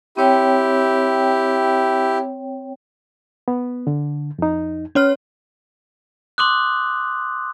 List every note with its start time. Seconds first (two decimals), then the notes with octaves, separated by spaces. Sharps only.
0.17 C4 E4 G4 C#5 G5
3.48 B3
3.87 D3
4.39 F2 D#4
4.95 C#4 C#5 F6
6.38 C6 D6 D#6 F#6